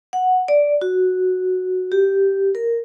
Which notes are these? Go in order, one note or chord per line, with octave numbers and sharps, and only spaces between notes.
F#5
D5
F#4
G4
A#4